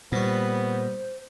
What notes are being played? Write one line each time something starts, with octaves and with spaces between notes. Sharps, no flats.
A#2 G3 B3 C5 C#5